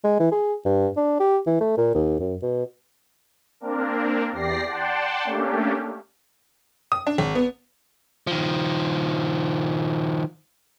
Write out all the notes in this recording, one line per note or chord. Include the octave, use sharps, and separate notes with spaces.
G#3
E3
G#4
G2
D4
G4
E3
A3
A#2
D#2
F#2
B2
A#3 C4 D4 A#4
E2 G4 D5 A#6 C7
D5 F#5 G5 A5 C6
A3 A#3 C#4 D4 G4
D#6
D4
G#1
B3
D#3 F3